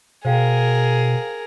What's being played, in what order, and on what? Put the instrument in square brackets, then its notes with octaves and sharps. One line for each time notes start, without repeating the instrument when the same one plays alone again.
[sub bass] B2 [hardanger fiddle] G#4 A#4 [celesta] C5 F5 G5